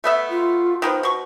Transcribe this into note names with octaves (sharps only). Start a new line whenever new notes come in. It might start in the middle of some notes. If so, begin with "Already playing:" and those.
A3 B3 E5
F4
D#3 F3 B3 C5
B2 C#6